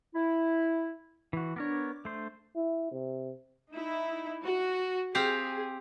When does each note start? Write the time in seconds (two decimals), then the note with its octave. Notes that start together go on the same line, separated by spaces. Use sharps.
0.15 E4
1.33 E3 F#4
1.56 B3 D4 A#4 C#5 D6
2.05 A3 C5
2.56 E4
2.92 C3
3.72 D#4 E4
4.46 F#4
5.15 C4 G4 G#4 F5